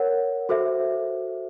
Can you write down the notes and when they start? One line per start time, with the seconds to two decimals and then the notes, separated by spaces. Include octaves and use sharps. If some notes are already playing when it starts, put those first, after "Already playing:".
Already playing: A#4 C#5 F#5
0.49 F#4 A4 C5 E5